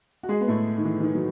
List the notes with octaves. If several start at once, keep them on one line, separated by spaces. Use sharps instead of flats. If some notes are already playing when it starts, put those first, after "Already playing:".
F#4
G#3 G#4
B3
A2 A3
D#3
E3
E3
D#3
F#3